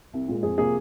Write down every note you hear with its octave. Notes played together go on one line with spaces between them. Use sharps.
C2
A#2 G#3
F2 G#4
C3 F3 A#3 G#4